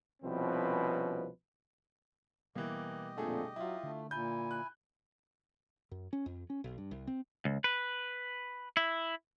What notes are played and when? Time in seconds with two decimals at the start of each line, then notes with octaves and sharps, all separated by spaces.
0.23 C2 B2 F3 C4 C#4 B4
2.55 B2 E3 G3 A#3 B3 G4 D#5
3.17 F2 A#2 D3 A3 G#4
3.56 F#3 E4 F4
3.83 D3 A3
4.11 A#2 E4 G#5 G6
4.51 F#6
5.91 F#2
6.13 C#4
6.26 F2
6.50 C#4
6.64 B1
6.78 G2
6.91 C2
7.07 C4
7.45 C#2
7.64 B4
8.77 E4